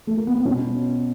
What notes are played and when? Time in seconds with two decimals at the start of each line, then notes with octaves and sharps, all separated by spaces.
0.07 A3
0.17 A#3
0.27 B3
0.35 C4
0.45 B2 B3 C#4